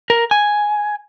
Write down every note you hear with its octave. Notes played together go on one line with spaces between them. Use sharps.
A#4
G#5